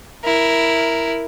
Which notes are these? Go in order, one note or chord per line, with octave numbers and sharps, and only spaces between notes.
E4 A#4